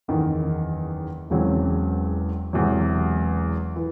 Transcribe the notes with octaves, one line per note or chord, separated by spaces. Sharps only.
F#1 E2 D#3
E1 E2 C#3 F#3 C4
E1 E2 C3 F#3
E3